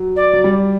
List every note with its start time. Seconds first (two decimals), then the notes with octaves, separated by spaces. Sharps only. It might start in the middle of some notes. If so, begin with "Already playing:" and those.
Already playing: F#3
0.16 D5
0.33 F#3
0.44 G3